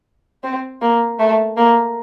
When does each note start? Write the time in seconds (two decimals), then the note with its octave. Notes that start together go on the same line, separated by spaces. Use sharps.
0.43 C4
0.81 A#3
1.19 A3
1.57 A#3